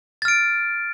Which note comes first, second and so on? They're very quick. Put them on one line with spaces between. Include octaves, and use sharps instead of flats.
A6 F6 D7